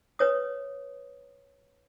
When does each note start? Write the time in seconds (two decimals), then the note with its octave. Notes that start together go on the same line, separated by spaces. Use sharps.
0.19 B4 C#5 D#6